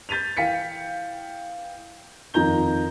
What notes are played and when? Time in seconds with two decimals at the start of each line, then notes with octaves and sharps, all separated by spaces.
0.09 G6 A6 B6 D#7 F7
0.37 E3 F5 G5 B6 C#7
2.34 F2 D#3 F4 A#5 G6 G7